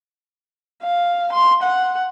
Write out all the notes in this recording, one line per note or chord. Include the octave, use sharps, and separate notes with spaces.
F5
C6
F#5